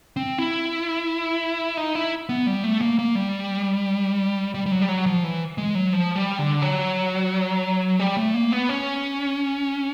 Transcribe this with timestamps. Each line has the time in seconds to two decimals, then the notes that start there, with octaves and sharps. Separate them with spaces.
0.17 C4
0.38 E4
1.77 D#4
1.95 E4
2.29 B3
2.47 G3
2.64 A3
2.81 A#3
2.99 A#3
3.15 G3
4.55 G3
4.66 G3
4.72 F#3
4.82 G3
4.88 F#3
5.06 F3
5.24 E3
5.58 G#3
5.75 F#3
5.93 F3
6.16 G3
6.39 D3
6.62 F#3
7.99 G3
8.17 A3
8.34 A#3
8.52 B3
8.69 C#4